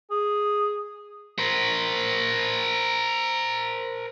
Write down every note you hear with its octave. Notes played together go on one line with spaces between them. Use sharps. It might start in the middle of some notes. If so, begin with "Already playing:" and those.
G#4
A#4 C5